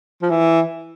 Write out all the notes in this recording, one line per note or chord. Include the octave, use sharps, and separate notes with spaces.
F3
E3